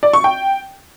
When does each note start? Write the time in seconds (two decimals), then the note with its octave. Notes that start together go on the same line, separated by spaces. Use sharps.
0.03 D5
0.13 C#6
0.24 G5